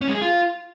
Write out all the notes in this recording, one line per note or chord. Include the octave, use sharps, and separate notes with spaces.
C#4
G#3
G#4
F4